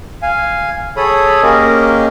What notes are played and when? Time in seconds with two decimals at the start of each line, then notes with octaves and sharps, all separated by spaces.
0.22 F5 G#5
0.97 G#4 A4 C#5 B5 D#6
1.43 A#3 C#4 G4 G#4 A#4 D#5